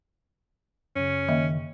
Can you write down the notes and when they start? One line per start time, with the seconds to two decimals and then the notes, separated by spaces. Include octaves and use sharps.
0.96 F#2 C#3 C#4
1.28 D#3 A#3 D#5 E5